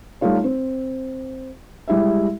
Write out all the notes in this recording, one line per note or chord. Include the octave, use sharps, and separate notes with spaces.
G3 A3 D#4 F4 C#5
C4
G3 G#3 E4 G4 E5